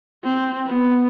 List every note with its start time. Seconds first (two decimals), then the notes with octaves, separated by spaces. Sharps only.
0.24 C4
0.66 B3